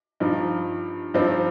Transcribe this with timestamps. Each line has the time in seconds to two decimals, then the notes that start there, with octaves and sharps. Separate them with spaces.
0.20 G2 F3 D#4
1.14 G2 F3 C4 D#4